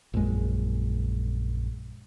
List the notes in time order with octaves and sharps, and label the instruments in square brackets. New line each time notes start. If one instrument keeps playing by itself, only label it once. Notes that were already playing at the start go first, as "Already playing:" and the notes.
[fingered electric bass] A#1 F#2 G#3